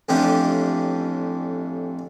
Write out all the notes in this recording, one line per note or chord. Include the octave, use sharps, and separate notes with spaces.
A1 F2 E3 C#4 D4 G4